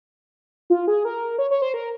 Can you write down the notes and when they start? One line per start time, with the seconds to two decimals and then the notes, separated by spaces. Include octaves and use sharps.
0.70 F4
0.88 G#4
1.05 A#4
1.38 C#5
1.51 C#5
1.62 C5
1.74 A#4